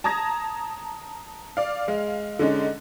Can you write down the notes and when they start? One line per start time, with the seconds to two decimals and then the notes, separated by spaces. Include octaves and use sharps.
0.04 A5 A#5 D#6 G#6 A#6
1.57 D5 F5
1.88 G#3 F5
2.39 D3 G#3 C#4 D#4